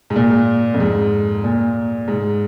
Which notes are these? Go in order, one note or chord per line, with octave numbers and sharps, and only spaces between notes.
G#2
A#2
F2
G#2
A#2
G#2